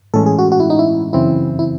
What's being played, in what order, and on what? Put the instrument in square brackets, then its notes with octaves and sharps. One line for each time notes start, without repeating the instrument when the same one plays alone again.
[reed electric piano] A2 E3 G#3 C#4 [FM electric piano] A4
[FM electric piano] G#4
F#4
F#4
E4
D#4
E4
[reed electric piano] F#2 C#3 E3 C4 [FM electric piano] E4
[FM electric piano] E4